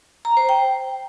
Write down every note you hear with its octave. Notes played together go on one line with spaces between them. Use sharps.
A#5
C5
G5